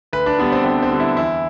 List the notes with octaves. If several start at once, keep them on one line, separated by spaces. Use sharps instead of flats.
D2 B4
D4
D3 G3 B3
C4
D2 C4
C4
D3 G3
E4
E2 E4